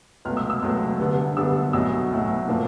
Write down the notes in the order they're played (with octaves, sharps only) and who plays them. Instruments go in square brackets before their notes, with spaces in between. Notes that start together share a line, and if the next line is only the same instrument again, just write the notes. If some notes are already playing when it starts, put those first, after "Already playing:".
[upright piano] C#2 B2 F#3 A3 F6
E6
E6
C#2 B2 F#3 A3
D2 D3 G3 B3 D4
D2 D3 G3 B3 D4 E6
B1 A2 F#3 E6
B1 A2 F#3
A2 F3 A#3 D4